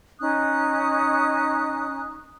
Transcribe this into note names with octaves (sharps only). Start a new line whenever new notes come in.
C#4 D#4 D#6 F#6